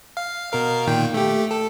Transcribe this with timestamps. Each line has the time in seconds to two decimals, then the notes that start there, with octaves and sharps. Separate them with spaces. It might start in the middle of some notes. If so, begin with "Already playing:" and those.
0.17 F5
0.51 B2 A#4 F5
0.87 A#2 D#3 G5
1.14 A3 G4
1.51 A4